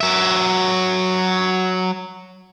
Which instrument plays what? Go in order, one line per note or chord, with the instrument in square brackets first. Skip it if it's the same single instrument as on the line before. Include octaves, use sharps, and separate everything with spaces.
[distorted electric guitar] F#3 E5